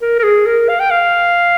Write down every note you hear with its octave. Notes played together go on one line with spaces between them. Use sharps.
A#4
A#4
G#4
A#4
F5
G5
F5